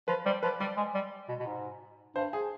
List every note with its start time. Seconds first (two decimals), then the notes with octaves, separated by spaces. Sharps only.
0.08 F3 B4
0.26 G3 C5
0.43 F3 B4
0.60 G3 D5
0.77 G#3
0.95 G3
1.29 B2
1.40 B2
1.47 G#2
2.16 G2 C5
2.33 G#4